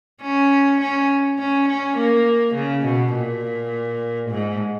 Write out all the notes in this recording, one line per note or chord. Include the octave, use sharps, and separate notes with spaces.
C#4
C#4
C#4
C#4
A#3
C#3
B2
A#2
G#2